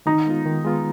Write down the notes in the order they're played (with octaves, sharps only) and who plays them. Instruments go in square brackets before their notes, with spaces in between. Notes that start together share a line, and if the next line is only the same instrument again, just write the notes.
[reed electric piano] D#3 [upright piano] D#4
[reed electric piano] G#3 B3 F4
D#3
G#3 B3 F4